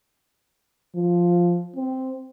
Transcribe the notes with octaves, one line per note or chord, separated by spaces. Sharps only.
F3
C4